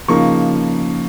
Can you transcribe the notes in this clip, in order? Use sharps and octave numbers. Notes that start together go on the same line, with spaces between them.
C#3 F3 A#3 D#4 C#6